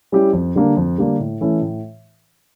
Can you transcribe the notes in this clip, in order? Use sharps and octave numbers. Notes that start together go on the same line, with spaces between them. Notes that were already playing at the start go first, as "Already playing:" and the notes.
G3 C#4 E4 G4
F2
D3 G3 A#3 D4
F2
D3 G3 A#3 D4
A2
E3 A3 C#4 E4
A2